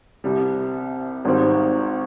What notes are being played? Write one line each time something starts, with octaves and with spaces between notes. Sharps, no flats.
C2 C3 G3
G#1 G#2 G3 C4